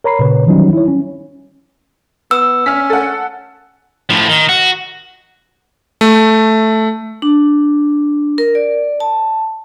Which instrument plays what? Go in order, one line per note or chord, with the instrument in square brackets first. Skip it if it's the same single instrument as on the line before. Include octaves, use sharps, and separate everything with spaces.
[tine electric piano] A#4 C#5 A#5 B5 C7
A#2 C#3 B4 C#5
D#3 E3 F#3 G3 C#4 D#4
E4 C#5
C#4
[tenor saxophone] B3 [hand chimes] E6
[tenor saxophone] C#4 [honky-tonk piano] F6 B6
[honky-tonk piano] A4 F#5
[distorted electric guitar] A2 F3
D#3
F#4
[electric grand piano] A3
[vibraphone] D4
A#4
D5
A5